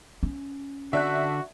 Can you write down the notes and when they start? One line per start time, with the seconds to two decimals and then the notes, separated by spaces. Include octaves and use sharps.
0.23 C#4
0.93 D3 D4 F#4 E5 F#6